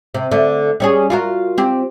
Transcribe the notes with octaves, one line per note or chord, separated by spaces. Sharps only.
C3
D3 A3
G3 C#4 G#4
F4 F#4 A#4
C4 G4